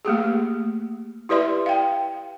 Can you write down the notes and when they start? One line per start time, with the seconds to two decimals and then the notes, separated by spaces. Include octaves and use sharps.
0.05 A3 A#3 G4 G#4
1.29 E4 G4 B4 D5 E5 C6
1.66 F5 G5